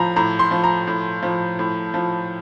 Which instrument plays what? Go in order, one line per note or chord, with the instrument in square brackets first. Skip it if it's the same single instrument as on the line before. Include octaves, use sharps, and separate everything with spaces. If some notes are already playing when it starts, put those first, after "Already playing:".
Already playing: [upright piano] A2 F3 A#5
A2 A#5
C6
F3
A#5
A2
F3
A2
F3